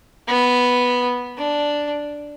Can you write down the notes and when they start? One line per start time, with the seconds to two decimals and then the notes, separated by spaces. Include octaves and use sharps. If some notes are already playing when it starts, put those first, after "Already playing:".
0.28 B3
1.38 D4